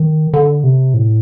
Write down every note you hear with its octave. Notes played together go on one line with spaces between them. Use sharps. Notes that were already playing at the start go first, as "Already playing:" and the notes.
Already playing: D#3
D3
C3
A2